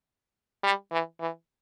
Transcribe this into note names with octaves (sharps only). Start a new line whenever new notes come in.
G3
E3
E3